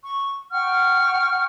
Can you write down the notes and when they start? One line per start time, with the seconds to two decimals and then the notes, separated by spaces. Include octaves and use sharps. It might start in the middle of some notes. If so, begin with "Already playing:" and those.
0.02 C#6
0.51 F#5 G5 C#6 F6